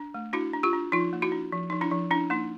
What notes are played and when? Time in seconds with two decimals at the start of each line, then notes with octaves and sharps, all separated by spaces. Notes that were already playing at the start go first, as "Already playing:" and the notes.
Already playing: D4
0.14 A3
0.33 D4 E4 F#4
0.53 D4
0.63 F4 G4
0.73 D4
0.92 F3 D#4 F4
1.13 A#3
1.22 E4 F#4
1.32 D4
1.52 F3
1.70 F3 D#4
1.81 D4 E4
1.91 F3
2.11 C#4 D4 E4
2.30 A#3 D#4